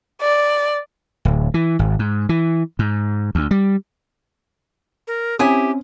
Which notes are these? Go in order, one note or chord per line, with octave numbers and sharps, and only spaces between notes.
D5
D1
E3
G#1
G#2
E3
G#2
D2
G3
A#4
C4 C#4 E4 G4 G#5 D#6